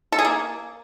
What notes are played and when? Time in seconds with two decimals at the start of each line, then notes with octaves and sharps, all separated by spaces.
0.12 A4
0.19 G#4
0.25 A#3